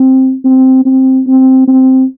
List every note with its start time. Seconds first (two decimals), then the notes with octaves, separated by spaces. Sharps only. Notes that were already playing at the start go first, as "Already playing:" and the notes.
Already playing: C4
0.45 C4
0.85 C4
1.27 C4
1.68 C4